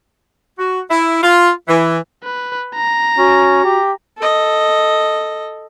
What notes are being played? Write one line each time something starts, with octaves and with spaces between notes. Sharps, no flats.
F#4
E4
F4
E3
B4
A#5
C#4 F#4
G4
A4 D#5